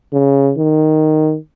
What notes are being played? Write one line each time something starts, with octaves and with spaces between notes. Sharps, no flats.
C#3
D#3